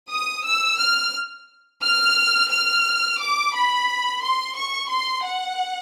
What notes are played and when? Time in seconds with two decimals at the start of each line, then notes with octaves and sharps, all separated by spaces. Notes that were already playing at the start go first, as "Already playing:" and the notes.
0.10 D#6
0.45 E6
0.79 F6
1.83 F6
2.51 F6
3.20 D6
3.54 B5
4.22 C6
4.56 C#6
4.91 C6
5.25 F#5